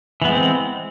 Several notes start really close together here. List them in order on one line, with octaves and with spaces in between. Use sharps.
E3 B3 G#3 C4